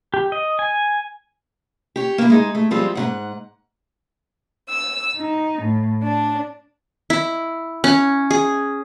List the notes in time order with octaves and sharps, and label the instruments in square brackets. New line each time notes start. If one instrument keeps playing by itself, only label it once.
[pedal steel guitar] G4
D#5
G#5
[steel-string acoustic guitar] G4 C#5
A#3 E4
G#3 D#4 G#4
A3
F3 G3 G#3 C4 F4
G#2 C#3 F#5
[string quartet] E6
D#4
A2
D4
[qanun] E4
C#4
G#4